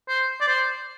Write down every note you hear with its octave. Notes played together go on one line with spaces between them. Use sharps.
C5
D5
C5